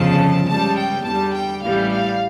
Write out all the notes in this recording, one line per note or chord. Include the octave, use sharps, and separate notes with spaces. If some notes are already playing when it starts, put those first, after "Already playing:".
Already playing: G1 F2 C#3 F3 A5
C#2 C#3 G3 A5
G5
E2 D3 G3 A5
G5
A1 A2 E3 G3 F5
F5